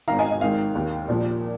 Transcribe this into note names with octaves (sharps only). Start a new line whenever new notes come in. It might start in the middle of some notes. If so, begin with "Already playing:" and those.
G#1 G#2 D#3 F5 A#5
D#5 G#5
D#5
G#1 G#2 D#3 F5
D#2 D#3
A#1 A#2 F3